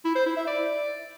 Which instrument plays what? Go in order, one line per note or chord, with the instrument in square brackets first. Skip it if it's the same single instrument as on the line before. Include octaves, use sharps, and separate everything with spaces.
[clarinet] E4
C5
E4
E5
D5